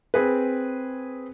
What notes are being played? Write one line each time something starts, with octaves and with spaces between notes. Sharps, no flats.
C4 G#4 B4